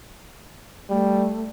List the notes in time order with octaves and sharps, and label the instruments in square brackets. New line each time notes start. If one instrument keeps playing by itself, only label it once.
[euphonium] G3 [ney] A3